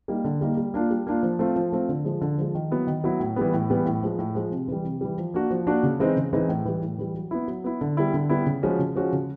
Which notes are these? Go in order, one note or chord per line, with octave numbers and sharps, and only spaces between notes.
G3 A#3 D#4
D3
G3 A#3 D#4
G3
A#3 D4 F4
G3
A#3 D4 F4
F3
A3 C4 F4
F3
A3 C4 F4
D3
F3 G#3
D3
F3 G#3
D#3
F#3 B3 E4
D#3
F#3 B3 E4
A2
E3 G3 B3
A2
E3 G3 B3
A2
F3 G#3
A2
F3 G#3
C3
E3 G3
C3
E3 G3
F3
A#3 D4 F#4
F3
A#3 D4 F#4
C#3
E3 G#3 C4 D#4
C#3
E3 G#3 C4 D#4
A2
E3 G3
A2
E3 G3
F#3
B3 E4
F#3
B3 E4
D3
G3 B3 E4
D3
G3 B3 E4
C#3
F3 G#3 C#4 F#4
C#3
F3 G#3 C#4 F#4
C#3